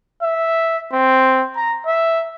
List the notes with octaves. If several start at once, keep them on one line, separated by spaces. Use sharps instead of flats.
E5
C4
A#5
E5